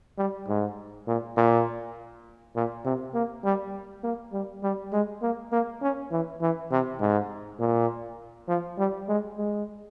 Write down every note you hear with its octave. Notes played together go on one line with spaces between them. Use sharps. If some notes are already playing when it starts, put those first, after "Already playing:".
G3
G#2
A#2
A#2
A#2
C3
A#3
G3
A#3
G3
G3
G#3
A#3
A#3
C#4
E3
E3
C3
G#2
A#2
F3
G3
G#3
G#3